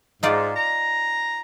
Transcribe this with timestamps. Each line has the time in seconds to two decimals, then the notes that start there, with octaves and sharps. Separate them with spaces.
0.23 G#2 D#4 F4 D5
0.56 A#5